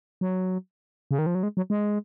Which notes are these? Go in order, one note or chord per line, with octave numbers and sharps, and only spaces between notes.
F#3
C#3
D#3
F3
F#3
G#3
F#3
G#3